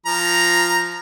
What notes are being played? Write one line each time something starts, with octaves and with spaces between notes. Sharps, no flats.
F3 A#5